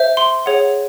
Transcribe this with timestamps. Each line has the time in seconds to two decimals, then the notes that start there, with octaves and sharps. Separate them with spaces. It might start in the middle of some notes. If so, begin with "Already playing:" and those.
Already playing: C5 E5
0.17 C6
0.46 G#4 C#5 F#5